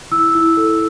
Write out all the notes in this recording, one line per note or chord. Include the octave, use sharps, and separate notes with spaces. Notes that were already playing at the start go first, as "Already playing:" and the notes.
E4 E6
E4
A4